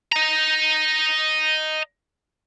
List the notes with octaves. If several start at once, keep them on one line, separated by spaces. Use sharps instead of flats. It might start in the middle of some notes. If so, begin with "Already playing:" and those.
D#5 A#5